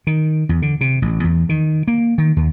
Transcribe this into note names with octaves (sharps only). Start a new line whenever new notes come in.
D#3
E2
D3
C3
A1
E2
D#3
A#3
D#3
D#2